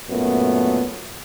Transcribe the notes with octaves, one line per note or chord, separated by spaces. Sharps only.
F#2 A#2 A3 B3